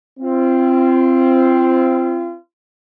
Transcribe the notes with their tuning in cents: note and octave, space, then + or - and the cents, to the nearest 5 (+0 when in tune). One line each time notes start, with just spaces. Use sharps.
C4 +0 F4 -35